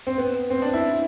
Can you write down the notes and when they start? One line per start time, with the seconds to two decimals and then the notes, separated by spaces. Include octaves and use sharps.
0.07 C4
0.18 B3
0.50 C4
0.62 D4
0.74 E4